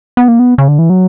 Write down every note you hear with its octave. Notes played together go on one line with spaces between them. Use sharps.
B3
A#3
B3
C#3
D3
E3
F#3